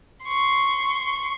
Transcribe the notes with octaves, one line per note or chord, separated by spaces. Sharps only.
C6 C#6